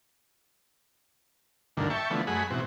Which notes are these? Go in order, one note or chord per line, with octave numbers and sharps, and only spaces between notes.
D2 G2 A#2 D3 D#3
E5 G5 A5 C#6
D3 E3 F3 A3 B3
F#2 G#3 A3 G#4 F#5 B5
G#2 B2 E3 C4 F#4